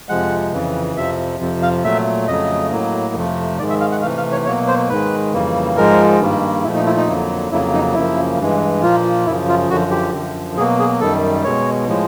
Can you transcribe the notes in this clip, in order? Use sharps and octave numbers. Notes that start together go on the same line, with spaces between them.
F2 C3 F3 G#3 F#5
F2 C#3 E3
F2 C3 F3 E5
F2 C3 F3
F5
A#2 F#3 A3 E5
F2 C#3 F#3 A3 D#5
A2 F#3 A#3
F2 C3 F3 A3
G#2 D#3 G#3 D5
E5
F5
F#5
C3 E3 A3 F5
F5
C#5
B2 F#3 A#3 C#5
C5
G#2 D#3 G#3 B4
F2 C#3 E3 G3 A#3
G#2 F3 G#3 A#4
G2 D#3 G3 A#3
A#2 F3 A3 E4
D#4
E4
D#4
F2 D3 F#3 A#3
F2 C#3 F#3 A#3 E4
D#4
F#2 C#3 F3 A#3 E4
G2 E3 G#3
A#2 F3 A#3 F4
F#2 C#3 F3 E4
F4
F#2 D3 F3 F#4
G4
F#2 D3 F3
B2 F#3 A#3 G#4
G#4
F#2 D#3 G3 A4
B2 G#3 C#5
A2 F3 G#3